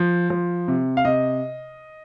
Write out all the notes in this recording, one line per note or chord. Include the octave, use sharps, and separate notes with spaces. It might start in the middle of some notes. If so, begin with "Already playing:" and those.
Already playing: F3
F3
C3
F5
C3 D#5